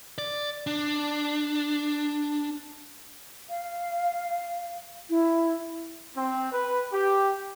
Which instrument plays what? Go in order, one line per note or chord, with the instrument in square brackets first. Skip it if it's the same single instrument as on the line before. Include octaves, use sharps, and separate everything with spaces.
[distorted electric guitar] D5
D4
[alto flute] F5
E4
[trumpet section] C4
B4
G4